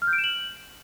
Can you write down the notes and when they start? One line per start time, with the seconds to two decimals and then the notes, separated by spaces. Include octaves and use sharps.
0.02 F6
0.07 G6
0.13 D7
0.18 E7
0.24 F#7